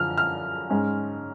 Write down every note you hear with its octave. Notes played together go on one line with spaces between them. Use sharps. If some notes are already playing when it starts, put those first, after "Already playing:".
Already playing: F#2 D3 F3 F6
F6
G#2 G#3 C#4